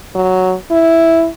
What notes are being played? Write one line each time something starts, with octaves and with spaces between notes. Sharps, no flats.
F#3
E4